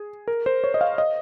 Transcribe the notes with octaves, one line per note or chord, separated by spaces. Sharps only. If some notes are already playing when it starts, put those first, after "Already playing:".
Already playing: G#4
A#4
C5
C#5
D#5
F5
D#5